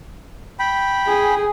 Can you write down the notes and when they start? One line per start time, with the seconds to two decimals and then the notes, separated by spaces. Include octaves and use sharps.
0.59 G5 B5
1.07 G#4